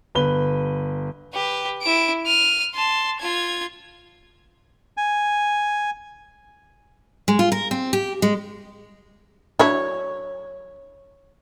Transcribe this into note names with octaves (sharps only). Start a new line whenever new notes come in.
G1 B4 G7
G4 B4
E4 D7
F6 D#7
A5 C6
F4 G#6
G#5
G#3
F4
A#4
C4
G4
G#3
F#3 D4 E4 C#5